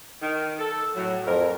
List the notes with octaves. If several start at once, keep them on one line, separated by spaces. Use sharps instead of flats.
D#3
A4
A2 F#3
F2 A#4